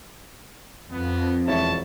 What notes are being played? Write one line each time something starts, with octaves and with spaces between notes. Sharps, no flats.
F2 B3
E1 E4 C#5 A5